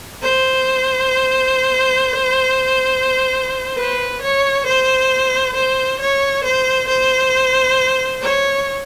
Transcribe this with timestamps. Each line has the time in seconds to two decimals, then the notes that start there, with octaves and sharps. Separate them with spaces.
0.22 C5
3.77 B4
4.22 C#5
4.66 C5
5.55 C5
6.00 C#5
6.44 C5
6.88 C5
8.22 C#5